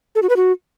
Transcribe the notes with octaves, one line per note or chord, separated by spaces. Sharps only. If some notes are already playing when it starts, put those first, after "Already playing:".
A4
F#4
B4
F#4